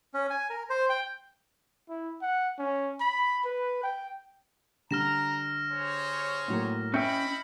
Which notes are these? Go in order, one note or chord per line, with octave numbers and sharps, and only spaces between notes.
C#4
G#5
A#4
C5
G5
E4
F#5
C#4
B5
B4
G5
D3 G3 A#5 F6 A#6 E7
G#4 C5 C#5
A2 F#3 A#3
C#4 E4 D#5 E5 G5 B5 G6 C#7